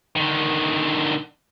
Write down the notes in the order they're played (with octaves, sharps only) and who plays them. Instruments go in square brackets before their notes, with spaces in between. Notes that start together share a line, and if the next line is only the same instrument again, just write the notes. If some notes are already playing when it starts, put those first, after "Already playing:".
[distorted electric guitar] D3 D#3